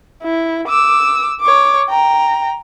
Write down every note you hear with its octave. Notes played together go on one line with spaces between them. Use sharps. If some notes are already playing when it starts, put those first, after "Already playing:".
E4
D6 E6
C#5 D6
G5 A#5